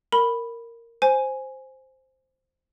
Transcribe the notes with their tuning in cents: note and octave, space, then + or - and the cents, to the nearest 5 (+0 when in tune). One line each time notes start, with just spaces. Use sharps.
A#4 -10 B5 +0
C5 +0 G#5 +0